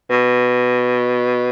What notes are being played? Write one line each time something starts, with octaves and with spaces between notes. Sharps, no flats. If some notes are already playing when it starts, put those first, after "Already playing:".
B2